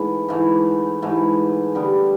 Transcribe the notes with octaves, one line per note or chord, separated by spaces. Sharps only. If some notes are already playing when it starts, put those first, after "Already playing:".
Already playing: G#2 E3 A3
G#2 E3 A3
G#2 E3 A3
D3 G3 B3